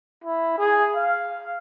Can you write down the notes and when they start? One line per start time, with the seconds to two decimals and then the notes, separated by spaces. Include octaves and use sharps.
0.24 E4
0.58 G#4
0.96 F5